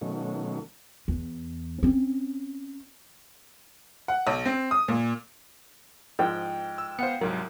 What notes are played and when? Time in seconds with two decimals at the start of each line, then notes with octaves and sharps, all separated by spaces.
0.01 B2 D#3 F#3 A3 C#4
1.08 E2
1.83 C4 C#4
4.08 F#5
4.27 B1
4.45 C4
4.71 D#6
4.88 A#2
6.19 G#2 F3 G5
6.78 E6
6.99 B3 C5 F5 F#5 C#7
7.21 C2 G#2 F#3 A#4